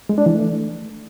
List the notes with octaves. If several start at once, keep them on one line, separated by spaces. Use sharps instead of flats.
G#3
D4
E3
A3